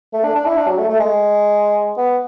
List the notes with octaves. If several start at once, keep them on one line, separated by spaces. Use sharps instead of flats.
A3
D4
D4
E4
D4
F#3
A3
A3
G#3
B3